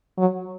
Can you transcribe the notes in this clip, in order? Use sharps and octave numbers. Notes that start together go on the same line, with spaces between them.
F#3